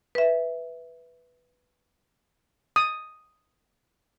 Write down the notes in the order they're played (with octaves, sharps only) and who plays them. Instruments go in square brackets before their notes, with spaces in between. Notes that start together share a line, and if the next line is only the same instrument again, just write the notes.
[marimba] B4 E5
[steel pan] D#6